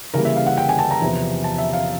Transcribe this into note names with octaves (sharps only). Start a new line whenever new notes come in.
C#3 E3 G3 A#3 A#4
E5
F5
F#5
G5
G#5
A5
A#5
E2 C3 F3
A5
E5
F5